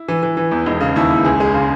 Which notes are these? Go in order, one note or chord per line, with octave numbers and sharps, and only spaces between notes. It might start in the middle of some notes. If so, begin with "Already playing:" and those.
Already playing: E4
E3
E3
E3
E2
E1 D#4
C#3
D#2 E4
E1
C#2 G#4
G#3
C#3